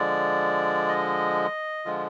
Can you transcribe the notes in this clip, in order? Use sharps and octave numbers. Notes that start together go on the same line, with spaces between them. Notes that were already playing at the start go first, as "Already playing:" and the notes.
Already playing: D3 F3 G#3 D5
D#5
D3 F3 G#3 F4